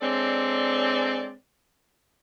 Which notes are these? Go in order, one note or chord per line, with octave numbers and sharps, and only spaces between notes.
G#3 C4 D4 A4 C#5 D5